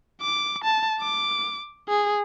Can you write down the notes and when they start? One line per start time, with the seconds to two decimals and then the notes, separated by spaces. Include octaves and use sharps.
0.21 D6
0.64 A5
1.01 D6
1.89 G#4